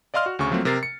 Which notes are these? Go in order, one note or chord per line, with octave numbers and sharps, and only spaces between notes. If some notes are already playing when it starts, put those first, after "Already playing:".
D5 D#5 F5 C6 F6
F#4
D2 C#3 C#6
F3 F#3 A3 A#3 C4
C3 A#4 A6 C7
C#7